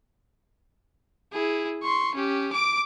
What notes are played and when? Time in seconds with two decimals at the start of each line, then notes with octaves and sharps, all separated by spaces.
1.32 E4 G#4
1.83 C6 C#6
2.15 C#4 G4
2.53 D6 D7